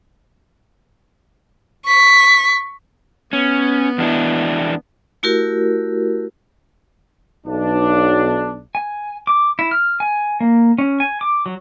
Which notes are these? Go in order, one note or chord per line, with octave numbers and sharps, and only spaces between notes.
C#6 B6
B3 C#4
E2 D4 E4
A3 E4 F#4 G4 A#4
B1 D4
G#5
D6
E4
F6
G#5
A#3
C#4
G#5
D6
F#3